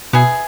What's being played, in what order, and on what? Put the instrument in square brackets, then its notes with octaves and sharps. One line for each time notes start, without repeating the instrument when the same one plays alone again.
[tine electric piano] B2 [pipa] B3 E4 G#4